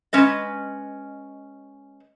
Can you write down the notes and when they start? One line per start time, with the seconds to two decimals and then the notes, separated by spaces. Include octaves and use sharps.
0.13 G#3 C#4 B4 D#5